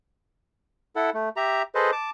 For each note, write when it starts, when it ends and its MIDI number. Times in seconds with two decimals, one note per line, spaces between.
0.96 1.10 64
0.96 1.10 69
0.96 1.10 78
1.14 1.29 57
1.37 1.62 67
1.37 1.62 76
1.37 1.62 82
1.75 1.91 68
1.75 1.91 69
1.75 1.91 71
1.75 1.91 72
1.75 1.91 75
1.92 2.10 81
1.92 2.10 86